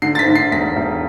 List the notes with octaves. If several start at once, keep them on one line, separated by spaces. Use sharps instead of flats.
D3 C7
A6
B6
D3
C7
E1 B6
E1